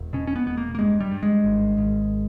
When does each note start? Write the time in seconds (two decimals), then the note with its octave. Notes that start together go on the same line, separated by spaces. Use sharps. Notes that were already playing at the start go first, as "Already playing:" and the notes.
Already playing: E1
0.13 B2 C#4
0.27 C#4
0.36 B3
0.46 E1 B3
0.57 A#3
0.75 A#3
0.79 G2 G#3
1.00 G3
1.12 G2
1.23 G#3
1.44 G#1
1.77 G#1